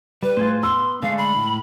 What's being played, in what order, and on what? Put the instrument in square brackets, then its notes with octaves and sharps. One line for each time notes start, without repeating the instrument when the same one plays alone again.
[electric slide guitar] G3 [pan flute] B4
[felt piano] A2 [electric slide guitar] F4 G#4 C5
[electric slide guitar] B3 [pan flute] C6 [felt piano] E6
[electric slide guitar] D3 G#3 A3 [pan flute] F5
[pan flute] B5
[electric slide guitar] A2